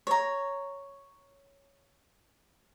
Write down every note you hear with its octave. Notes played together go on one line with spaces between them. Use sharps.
C#5 A#5